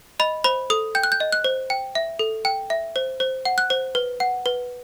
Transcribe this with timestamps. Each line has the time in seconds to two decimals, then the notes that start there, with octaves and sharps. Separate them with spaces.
0.20 D#5 B5
0.44 C5 B5
0.70 A4 D#6
0.95 G5 G6
1.03 F#6
1.12 G6
1.20 D#5
1.32 F#6
1.44 C5
1.70 G5
1.95 E5
2.19 A4
2.45 G5
2.70 E5
2.96 C5
3.20 C5
3.45 F#5
3.58 F#6
3.70 C5
3.95 B4
4.20 F#5
4.46 B4